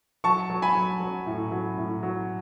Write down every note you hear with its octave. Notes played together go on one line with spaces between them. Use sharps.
F#3 A5 C#6
F#3
G#5 B5
F#3
F#3
A2
F#3
A2
F#3